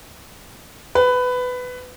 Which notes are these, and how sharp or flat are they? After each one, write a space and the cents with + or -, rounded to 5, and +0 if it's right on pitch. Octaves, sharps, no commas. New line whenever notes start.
B4 +15